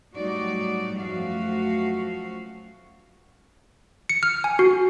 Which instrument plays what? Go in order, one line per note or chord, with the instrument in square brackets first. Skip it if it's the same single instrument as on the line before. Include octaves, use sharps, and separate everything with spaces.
[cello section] A2 F#3 G3 D#4 F#4 D5
F#2 F3 A3 F#4 F5
[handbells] C#7
F6
G#5
F#4